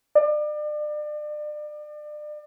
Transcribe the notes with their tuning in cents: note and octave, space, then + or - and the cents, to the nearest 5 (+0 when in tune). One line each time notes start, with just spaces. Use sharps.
D5 +35